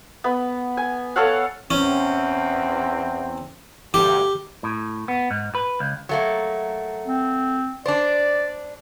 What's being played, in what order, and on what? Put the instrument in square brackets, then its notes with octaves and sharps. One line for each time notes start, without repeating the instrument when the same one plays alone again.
[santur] B3
G#5
A4 C#5 F5 F#5
[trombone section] E2 C4 [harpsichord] C#4
[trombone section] D2 G2 [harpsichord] G4
[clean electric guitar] A2
B3
G#2
B4
C#2
[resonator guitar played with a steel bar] F#3 A3 A#3
[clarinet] C4
[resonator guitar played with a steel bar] D4 C5 [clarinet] D5